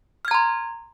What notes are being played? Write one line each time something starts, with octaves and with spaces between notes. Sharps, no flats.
A#5 C6 F6 G#6